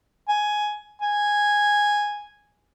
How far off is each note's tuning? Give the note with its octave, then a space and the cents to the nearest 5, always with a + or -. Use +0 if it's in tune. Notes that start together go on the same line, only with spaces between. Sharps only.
G#5 +10
G#5 -5